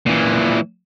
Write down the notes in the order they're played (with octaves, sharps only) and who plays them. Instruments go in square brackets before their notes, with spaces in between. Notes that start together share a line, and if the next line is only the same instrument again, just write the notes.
[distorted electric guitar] A#2 E3